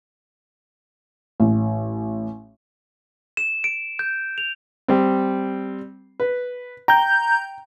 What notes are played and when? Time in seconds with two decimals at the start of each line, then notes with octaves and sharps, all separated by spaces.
1.40 A1
3.37 E7
3.64 D7
3.99 G6
4.38 F7
4.88 G3 C4
6.20 B4
6.88 G5 A#5 G6